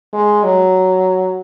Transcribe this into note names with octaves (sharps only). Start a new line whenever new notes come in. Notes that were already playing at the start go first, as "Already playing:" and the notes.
G#3
F#3